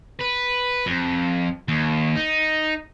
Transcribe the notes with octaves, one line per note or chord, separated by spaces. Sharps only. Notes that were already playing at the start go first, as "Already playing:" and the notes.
B4
F2
D#2
D#4